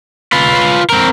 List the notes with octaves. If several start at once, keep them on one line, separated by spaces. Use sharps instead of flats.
F4 B4
C4 A#4